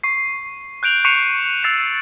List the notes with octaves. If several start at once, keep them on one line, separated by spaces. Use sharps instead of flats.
C#6 C7
F#6 G6 D7 F7 F#7
C#6 F#6 C7 C#7 E7 F7
E6 A6 C7 E7 F7